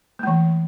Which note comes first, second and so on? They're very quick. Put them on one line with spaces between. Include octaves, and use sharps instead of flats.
A#3 A3 E3